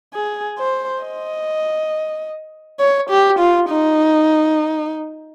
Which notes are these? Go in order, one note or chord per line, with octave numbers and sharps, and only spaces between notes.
G#4
C5
D#5
C#5
G4
F4
D#4